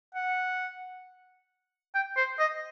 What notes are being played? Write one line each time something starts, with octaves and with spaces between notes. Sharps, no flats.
F#5
G5
C5
D#5